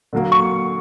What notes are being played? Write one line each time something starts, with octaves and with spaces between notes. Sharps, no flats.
D3 F#3 A#3
C#6